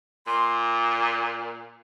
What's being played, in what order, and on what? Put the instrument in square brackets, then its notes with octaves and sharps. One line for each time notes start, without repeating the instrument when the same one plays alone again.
[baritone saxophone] A#2 [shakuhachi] C6